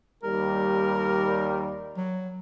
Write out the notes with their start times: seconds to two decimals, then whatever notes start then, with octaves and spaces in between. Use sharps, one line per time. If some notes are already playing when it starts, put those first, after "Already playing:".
0.23 D#2 G3 A#4
1.97 F#3